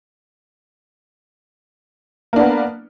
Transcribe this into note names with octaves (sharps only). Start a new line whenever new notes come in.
A#3 B3 D4